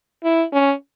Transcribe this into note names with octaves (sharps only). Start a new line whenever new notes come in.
E4
C#4